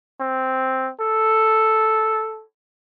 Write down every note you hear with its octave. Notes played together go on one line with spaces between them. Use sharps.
C4
A4